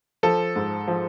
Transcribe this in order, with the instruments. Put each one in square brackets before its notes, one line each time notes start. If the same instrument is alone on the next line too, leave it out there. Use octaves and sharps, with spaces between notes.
[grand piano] F3 A4
G#2
F3